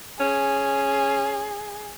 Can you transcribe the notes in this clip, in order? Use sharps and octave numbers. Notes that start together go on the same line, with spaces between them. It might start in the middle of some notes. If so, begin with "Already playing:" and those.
C#4 G#4